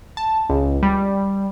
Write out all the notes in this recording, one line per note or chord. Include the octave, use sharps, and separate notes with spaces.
A5
C#2
G3